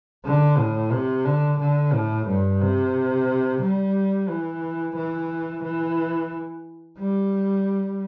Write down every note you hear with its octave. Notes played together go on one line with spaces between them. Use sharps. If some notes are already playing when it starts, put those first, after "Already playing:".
D3
A2
C3
D3
D3
A2
G2
C3
G3
E3
E3
E3
G3